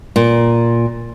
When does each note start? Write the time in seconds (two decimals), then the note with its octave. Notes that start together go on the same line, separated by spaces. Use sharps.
0.16 A#2